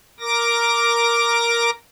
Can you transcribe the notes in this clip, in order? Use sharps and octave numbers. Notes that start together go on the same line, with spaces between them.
A#4 D6 A#6